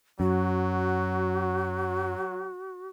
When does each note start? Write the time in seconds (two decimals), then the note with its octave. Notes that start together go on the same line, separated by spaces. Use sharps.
0.20 F#2 F#3 F#4